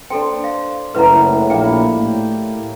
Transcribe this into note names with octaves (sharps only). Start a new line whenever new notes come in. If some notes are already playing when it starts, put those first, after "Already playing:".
D4 A4 C5 G5
F5
F#1 A2 F#3 F#4 B4 F#5 A#5
A#1 A#3 E4 G5
A2 G4